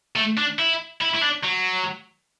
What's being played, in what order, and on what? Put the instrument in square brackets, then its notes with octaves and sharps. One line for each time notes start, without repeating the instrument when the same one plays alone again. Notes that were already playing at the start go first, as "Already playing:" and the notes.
[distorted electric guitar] A3
D4
E4
E4
E4
D4
F#3